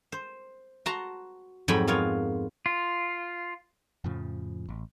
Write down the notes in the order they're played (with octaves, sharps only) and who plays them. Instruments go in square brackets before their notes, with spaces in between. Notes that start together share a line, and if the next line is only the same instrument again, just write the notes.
[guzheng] C5
F#4 F#5 A5 A#5 C6
F2 G#2 F#3 G5 G#5 B5
B3 F4 A#4 C#5
[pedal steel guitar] F4
[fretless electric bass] F2 A2 C#3 F3
A1